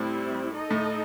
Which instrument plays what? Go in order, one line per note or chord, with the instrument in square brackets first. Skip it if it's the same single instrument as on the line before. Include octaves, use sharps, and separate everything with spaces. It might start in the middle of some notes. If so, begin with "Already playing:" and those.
Already playing: [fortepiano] A2 [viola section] G3 C4 E4
[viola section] D#4 A4 D#5
[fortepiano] A2